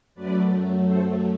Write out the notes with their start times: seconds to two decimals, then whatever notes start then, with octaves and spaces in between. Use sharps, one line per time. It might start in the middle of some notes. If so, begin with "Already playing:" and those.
0.15 F#2 F#3 A3 B4 D5
0.87 A4 C5